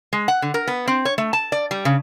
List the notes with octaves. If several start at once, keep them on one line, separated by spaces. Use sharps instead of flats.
G#3
F#5
D3
A#4
B3
C4
C#5
A3
A5
D5
G3
C#3